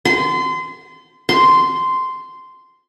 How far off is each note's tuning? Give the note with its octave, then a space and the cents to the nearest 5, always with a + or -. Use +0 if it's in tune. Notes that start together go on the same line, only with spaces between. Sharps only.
C6 -30
C6 -10